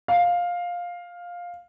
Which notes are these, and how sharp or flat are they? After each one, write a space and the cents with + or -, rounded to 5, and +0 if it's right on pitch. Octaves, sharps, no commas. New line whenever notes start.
F5 +10